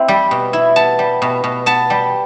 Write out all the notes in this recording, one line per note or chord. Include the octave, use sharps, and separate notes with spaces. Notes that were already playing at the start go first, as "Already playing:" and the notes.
Already playing: C4 E4
G3
B2
E4
B3 A5
G3
B2
B2
B3 A5
G3